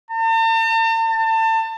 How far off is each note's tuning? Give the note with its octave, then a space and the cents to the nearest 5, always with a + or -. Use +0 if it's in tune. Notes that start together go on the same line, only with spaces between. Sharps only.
A5 +45
A5 +30